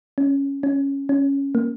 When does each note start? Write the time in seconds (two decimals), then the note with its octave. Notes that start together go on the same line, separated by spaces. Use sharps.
0.18 C#4
0.63 C#4
1.09 C#4
1.55 A#3